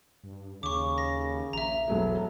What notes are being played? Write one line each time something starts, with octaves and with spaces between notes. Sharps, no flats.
G2
D#2 C#3 C#6 D6
A#6
A#1 E5 A#5
E1 F#3 G#3 A4